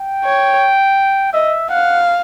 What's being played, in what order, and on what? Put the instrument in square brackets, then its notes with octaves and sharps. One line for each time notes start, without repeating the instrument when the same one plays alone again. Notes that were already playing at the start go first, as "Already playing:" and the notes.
Already playing: [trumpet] G5
[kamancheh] C#5
[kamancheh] D#5 [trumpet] E5
[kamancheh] F5 [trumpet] F#5